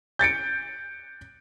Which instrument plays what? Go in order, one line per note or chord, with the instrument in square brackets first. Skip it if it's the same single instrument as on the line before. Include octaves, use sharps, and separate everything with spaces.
[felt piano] G6 A6 C#7 D7